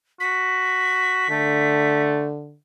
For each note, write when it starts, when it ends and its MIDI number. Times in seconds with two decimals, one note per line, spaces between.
0.20 1.25 66
0.20 2.02 95
1.30 2.56 50
1.30 2.26 57